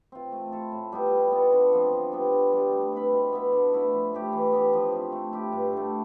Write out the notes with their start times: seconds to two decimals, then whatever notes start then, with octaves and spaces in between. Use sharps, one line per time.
0.12 C4 F4
0.32 A3
0.52 E4 A4
0.72 A2
0.92 G3 B3 E4
1.12 G3
1.32 B3 F4 A4
1.53 D3
1.72 F3 C4 F4
1.92 D3
2.12 G3 B3
2.32 D3
2.53 G3 D4
2.72 A3
2.93 C4 E4 B4
3.12 B2
3.33 B3 E4 B4
3.52 D3
3.73 A3 E4 B4
3.92 F3
4.13 A3 E4 G4
4.32 E3
4.52 B3 D4 G4
4.73 F3
4.92 C4 E4
5.12 A3
5.33 E4 G4
5.52 G2
5.73 D3 A3